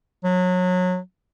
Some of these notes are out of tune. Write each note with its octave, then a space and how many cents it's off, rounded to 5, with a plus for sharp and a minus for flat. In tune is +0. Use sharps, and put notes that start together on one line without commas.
F#3 -25